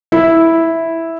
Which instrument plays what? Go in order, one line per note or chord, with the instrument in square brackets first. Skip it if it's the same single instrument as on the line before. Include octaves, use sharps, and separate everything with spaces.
[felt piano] E4